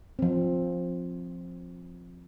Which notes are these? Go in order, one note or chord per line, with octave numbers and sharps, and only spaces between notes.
F3 C4